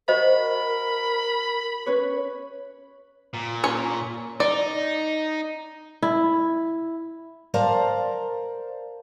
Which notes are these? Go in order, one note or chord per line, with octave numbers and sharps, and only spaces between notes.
F#4 A#4 C5 D#5 B5
C#4 B4 C#5
A#2
C#4 C#5
D#4 D5
E4
A#4 C5 D5 F5 A5 A#5